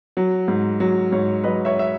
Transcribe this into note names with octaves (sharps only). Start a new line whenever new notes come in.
F#3
G#2
F#3
G#2 C#5
F#3 B4 D#5
C#5 E5
E5